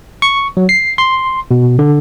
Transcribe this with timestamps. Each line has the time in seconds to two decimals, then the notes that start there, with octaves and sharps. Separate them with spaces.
0.22 C#6
0.57 F#3
0.69 C7
0.98 C6
1.51 B2
1.79 D3